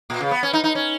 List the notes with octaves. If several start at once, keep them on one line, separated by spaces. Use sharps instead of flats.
A#2
C#3
B3
C#4
D#4
D#4
C#4